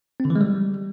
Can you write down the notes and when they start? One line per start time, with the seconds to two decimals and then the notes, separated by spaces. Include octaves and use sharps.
0.20 C4
0.25 D3
0.30 E3
0.36 G#3
0.41 G3